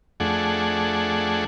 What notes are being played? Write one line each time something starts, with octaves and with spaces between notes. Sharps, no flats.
F2 A3 D4 G#4 F#5